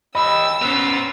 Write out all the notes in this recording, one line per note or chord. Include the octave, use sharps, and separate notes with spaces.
G4 D#5 B5 E6
B3 C#4 F4 A#4